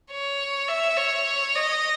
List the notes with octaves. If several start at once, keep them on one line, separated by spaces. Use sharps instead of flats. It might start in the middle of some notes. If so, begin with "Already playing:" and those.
C#5
E5
C#5
D#5